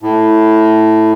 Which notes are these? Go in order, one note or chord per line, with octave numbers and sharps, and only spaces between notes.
A2